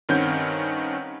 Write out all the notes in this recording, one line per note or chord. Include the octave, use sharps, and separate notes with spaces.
G2 D#3 C4 C#4 F#5 G6